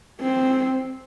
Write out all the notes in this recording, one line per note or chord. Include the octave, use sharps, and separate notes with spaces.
C4